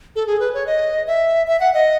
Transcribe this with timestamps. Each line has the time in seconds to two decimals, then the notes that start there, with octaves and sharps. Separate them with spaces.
0.16 A4
0.27 G#4
0.40 B4
0.54 C#5
0.67 D#5
1.07 E5
1.47 E5
1.60 F#5
1.74 D#5